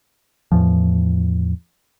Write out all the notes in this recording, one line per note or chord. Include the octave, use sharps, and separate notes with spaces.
E2 A2 F3